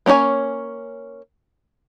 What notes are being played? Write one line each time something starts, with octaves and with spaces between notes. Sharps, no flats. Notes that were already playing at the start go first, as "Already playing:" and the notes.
A#3 C#4 D4 C#5 G#5